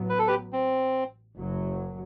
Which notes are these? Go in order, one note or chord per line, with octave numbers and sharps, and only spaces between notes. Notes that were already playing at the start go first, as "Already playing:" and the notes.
Already playing: A1 A2 F#3 B3
B4
A4
G4 B4
C4
F#1 F#2 F#3